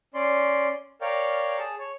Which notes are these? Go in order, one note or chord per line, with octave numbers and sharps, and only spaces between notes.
C#4 D5 C6
A#4 C#5 D5 F5 G5
G#4 A5
C#5